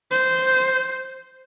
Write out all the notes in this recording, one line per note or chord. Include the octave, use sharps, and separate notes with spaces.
C5